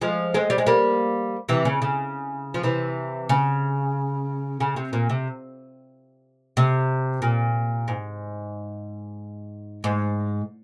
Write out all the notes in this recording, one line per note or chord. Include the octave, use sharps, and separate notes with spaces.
F3 G#3
G#3 C4
G3
G#3
G3 A#3
C3 E3
C#3
C#3
F3
C3 E3
C#3
C#3
C3
A#2
C3
C3
A#2
G#2
G#2